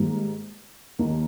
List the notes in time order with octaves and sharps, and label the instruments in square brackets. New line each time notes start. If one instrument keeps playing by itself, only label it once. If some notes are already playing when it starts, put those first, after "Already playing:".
Already playing: [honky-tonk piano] G#2 D#3 G3 A#3
D#2 D#3 A#3